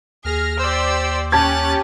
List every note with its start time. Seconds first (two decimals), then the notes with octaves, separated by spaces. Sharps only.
0.25 D#2 G#4 F6 A#6
0.59 G4 C5 D5 E6
1.32 C#4 G4 A5 F#6 G#6 A6